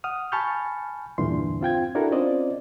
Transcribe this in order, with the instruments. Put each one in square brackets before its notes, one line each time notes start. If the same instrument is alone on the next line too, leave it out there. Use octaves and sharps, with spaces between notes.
[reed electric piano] F#5 D#6 F6
G#5 A5 B5 C#6 F6 G6
E2 G2 A#2 D3 E3 C6
C4 F4 G5 G#6
D4 E4 F#4 A4 A#4
C4 C#4 F4 C5 D5 D#5